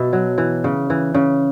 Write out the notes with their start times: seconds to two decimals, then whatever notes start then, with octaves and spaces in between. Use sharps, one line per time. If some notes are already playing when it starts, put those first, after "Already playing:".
Already playing: B2 E5
0.13 F#3
0.38 E3
0.64 C#3
0.90 E3
1.14 C#3